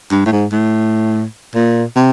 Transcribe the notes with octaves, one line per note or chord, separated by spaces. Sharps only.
G2
A2
G#2
A2
A#2
C3